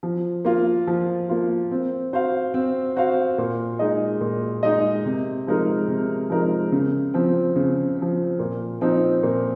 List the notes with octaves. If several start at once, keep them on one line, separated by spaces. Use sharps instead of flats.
F3
A#3 F4
F3
A#3 F4
C4
F#4 C5 F5
C4
F#4 C5 F5
A#2
G#3 D#4 G#4 D#5
A#2
G#3 D#4 G#4 D#5
C3
F3 G#3 D#4 A#4
C3
F3 G#3 D#4 A#4
C#3
F3 C4
C#3
F3 C4
A#2
F3 C4 D#4
A#2